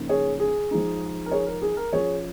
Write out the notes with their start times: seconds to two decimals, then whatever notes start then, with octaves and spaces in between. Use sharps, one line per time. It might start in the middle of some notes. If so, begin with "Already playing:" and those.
Already playing: C#3 F3 A#3 D#4
0.09 G#4 C#5
0.40 G#4
0.71 F3 G#3 D#4
1.26 A#4
1.32 G#4 C#5
1.46 A#4
1.62 G#4
1.77 A#4
1.93 F3 C#4 F4 G#4 C#5